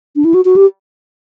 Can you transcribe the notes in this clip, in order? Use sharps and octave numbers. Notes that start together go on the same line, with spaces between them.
D4
E4
F#4
F#4
G4